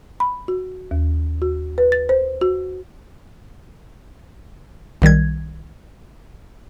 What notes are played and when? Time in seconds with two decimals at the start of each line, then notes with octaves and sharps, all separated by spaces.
0.20 B5
0.48 F#4
0.91 D#2
1.42 F#4
1.78 B4
1.92 A6
2.09 C5
2.41 F#4
5.02 B1 D#3 G3 G#6